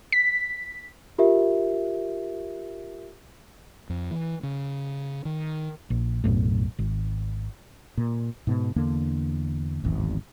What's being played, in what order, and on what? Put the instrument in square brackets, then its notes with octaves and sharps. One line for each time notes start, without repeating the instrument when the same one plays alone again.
[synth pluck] B6
[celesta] F4 G4 A#4 E5
[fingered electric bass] F2
E3
C#3
D#3
A#1
B1 F#2 A2
G#1
[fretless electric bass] A#2
G#2 B2
E2 D3 A#3 D4
D1 G#1 E2